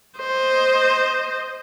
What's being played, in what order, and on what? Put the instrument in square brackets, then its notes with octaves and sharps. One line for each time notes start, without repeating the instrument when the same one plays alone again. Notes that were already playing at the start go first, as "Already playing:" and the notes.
[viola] C5 D#5